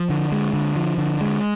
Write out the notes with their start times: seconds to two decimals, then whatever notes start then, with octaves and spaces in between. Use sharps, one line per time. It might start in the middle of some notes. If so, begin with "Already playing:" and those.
Already playing: F3
0.10 D3
0.32 G#3
0.53 D3
0.76 F3
0.98 D3
1.21 G#3